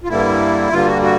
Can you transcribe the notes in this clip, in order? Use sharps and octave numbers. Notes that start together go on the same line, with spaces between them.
F4
G2 D3 G3 A#3 E4
G2 D3 G3 A#3 F4
F#4
F#4